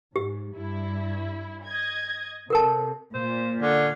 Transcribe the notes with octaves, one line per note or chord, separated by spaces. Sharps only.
G#2 G4
G2 E4
D#5 G#6
C3 A4 A#4 A5
A#2 C5
D3 C#4